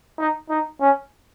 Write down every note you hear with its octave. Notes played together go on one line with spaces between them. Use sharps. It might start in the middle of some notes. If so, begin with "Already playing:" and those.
D#4
D#4
C#4